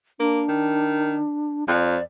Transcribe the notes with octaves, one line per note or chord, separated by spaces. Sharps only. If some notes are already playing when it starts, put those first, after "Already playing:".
A#3 D4
D#3
F2 D5